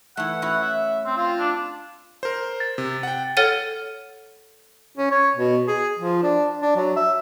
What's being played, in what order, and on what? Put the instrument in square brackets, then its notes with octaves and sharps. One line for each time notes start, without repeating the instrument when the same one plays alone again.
[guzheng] E3 A3 [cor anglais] F#5
[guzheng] C#4 E4 F#4
[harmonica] E5
[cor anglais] C4
[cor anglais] C4 [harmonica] F4
[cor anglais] D4
[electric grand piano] A#4 C5
[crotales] A6
[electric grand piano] C3
F#5 G5
[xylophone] A4 C#5 F#5 F6 A6 D#7
[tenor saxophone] C#4
C#5
B2
G#4
F3
D4
D4
F#3
E5